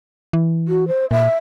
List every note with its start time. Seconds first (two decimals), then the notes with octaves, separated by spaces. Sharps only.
0.33 E3
0.68 F#4
0.88 C5
1.11 A#2 E5